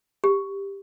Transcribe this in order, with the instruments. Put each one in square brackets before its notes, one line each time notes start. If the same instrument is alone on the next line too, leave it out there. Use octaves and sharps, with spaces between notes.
[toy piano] G4